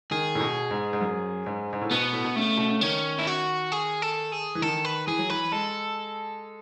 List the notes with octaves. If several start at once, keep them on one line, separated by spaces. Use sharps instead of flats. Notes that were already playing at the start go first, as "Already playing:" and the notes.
D#3 G#4
A2
B2
G#2
G#2
F#2
G#2
G#2
A2
B2 B3
A2
B2
C#3 A3
B2
C#3
D#3 C#4
E4
F#4
G#4
A4
G#4
E3
D#3 A4
B4
E3 G#4
F#3
E3 B4
G#3 A4